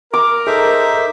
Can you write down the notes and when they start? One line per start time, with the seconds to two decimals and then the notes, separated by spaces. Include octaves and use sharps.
0.13 A#4 D6
0.47 D#4 G#4 A4 C5 E5